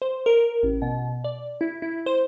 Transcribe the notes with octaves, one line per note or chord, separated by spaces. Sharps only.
C5
A#4
A1
B2
D5
E4
E4
C5